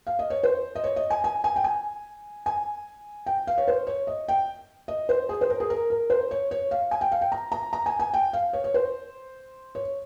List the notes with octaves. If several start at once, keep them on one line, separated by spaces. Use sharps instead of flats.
F5
D#5
C#5
C5
D#5
C#5
D#5
G#5
G#5
G#5
G5
G#5
G#5
G5
F5
C#5
C5
C#5
D#5
G5
D#5
C5
G#4
C5
A#4
G#4
A#4
A#4
C5
C#5
C#5
F5
G#5
G5
F5
G5
A#5
A#5
A#5
G#5
G#5
G5
F5
C#5
C#5
C5
C#5